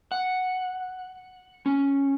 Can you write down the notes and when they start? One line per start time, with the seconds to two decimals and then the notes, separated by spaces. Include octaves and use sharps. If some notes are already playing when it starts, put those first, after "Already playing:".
0.12 F#5
1.66 C#4